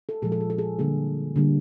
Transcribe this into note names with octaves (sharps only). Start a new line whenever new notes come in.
A4
A#2 F3 G#3 G#4
A4
G#4
A4
G#4
D3 G3 A#3 G#4
D3 G3 A#3